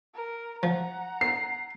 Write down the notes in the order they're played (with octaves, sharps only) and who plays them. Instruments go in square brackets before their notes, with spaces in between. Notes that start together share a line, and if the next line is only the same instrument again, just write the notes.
[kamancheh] A#4
[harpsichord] F3 [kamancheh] F#5 A#5
[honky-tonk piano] C7